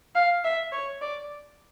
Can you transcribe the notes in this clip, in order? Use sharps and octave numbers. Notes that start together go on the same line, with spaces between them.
F5
E5
C#5
D5